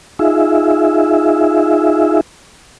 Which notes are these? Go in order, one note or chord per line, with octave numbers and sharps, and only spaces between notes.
D#4 F4 G#4 E5